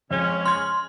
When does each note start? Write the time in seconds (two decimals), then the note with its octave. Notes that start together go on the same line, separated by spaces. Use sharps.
0.11 F2 C#3 G#3 C#4 G7
0.45 C6 F6 G#6